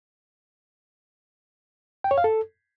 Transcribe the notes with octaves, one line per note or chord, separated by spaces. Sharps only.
G5
C#5
F5
A4